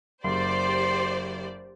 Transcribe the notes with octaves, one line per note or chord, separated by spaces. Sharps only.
F#1 G4 C5 D5 C6